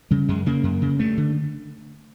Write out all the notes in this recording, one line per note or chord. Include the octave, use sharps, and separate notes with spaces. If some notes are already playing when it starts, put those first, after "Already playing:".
C#3 G3
F#2 G#3
C#3 A#3
F#2
C#3
G2 A3
D3